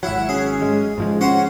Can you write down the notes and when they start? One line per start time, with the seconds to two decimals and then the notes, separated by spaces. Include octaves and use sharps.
0.03 G#1 F#3 E4 E5 F#5
0.29 C#4 G#4
0.62 G#3
0.98 G#2 F3 G#3
1.21 C#4 F#4 C5 F#5